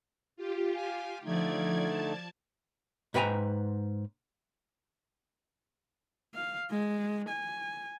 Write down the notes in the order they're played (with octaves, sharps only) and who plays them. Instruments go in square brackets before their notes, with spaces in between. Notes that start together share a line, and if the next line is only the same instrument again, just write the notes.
[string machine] F4 G4
[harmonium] F5 G#5
[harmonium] D3 A3 D#4 [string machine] F3 D5 G#6
[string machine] A5
[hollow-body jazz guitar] G#2 B4 G5 G#5 A#5
[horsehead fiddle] F5
G#3
G#5